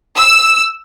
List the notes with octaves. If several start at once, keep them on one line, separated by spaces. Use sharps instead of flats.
E6